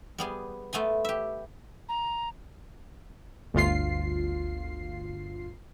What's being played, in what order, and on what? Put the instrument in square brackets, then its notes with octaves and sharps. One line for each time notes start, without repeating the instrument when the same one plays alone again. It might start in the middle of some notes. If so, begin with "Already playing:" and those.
[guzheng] G3 B3 G#4
A3 B3 G#5 C6
G4 E5
[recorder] A#5
[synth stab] G1 D2 F4 C7